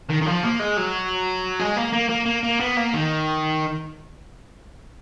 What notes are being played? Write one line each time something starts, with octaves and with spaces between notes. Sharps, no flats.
D#3
D#3
F3
A#3
G#3
F#3
G#3
A#3
A#3
A#3
A#3
A#3
B3
A#3
D#3